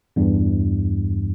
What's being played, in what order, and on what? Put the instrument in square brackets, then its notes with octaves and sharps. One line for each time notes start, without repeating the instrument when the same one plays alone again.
[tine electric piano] E2 G2